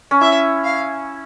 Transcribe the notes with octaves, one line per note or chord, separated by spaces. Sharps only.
C#4
E4 E5
F5